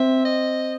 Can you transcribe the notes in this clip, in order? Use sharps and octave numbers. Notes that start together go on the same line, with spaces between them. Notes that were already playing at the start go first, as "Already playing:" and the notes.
Already playing: C4 E5
D#5